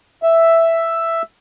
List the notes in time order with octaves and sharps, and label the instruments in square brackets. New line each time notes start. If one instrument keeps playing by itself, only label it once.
[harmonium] E5